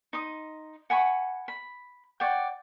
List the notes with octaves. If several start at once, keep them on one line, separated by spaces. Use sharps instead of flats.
D#4 C6 D#6
F#5 G#5 B5 C#6
B5
C#5 D5 F#5 G5